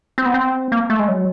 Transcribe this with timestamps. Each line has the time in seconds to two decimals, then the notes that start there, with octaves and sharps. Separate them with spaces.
0.18 C4
0.26 B3
0.34 C4
0.72 A#3
0.90 A3
0.99 G#3
1.08 F#3